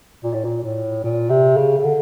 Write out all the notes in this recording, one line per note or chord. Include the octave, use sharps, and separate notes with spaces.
A#2
A2
A#2
A2
A#2
C3
C#3
C#3
D3